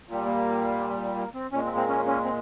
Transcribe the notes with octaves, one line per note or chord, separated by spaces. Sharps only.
A#2 G3
A#3
A#3
C4
A#2 G#3 C#4
C4
C4
C#4
C#4
C4